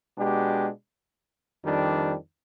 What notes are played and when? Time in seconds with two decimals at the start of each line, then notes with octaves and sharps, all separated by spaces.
0.18 B2 G#3 D4 G4
1.64 F2 D#3 G3 D4